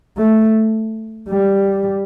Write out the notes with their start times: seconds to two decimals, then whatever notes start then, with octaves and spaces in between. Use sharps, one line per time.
0.17 A3
1.29 G3